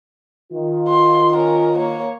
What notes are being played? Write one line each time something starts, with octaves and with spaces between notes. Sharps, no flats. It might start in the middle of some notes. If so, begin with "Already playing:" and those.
D#3 F4
C6
C#4 A#4
A#3 C#5